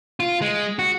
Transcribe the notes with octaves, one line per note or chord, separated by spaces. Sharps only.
F4
G#3
F#4